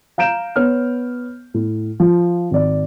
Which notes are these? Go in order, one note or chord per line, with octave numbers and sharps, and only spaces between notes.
F5 A#5 G6 D7 E7
B3 C#5 F6
A2
F3 F4
G#1 D5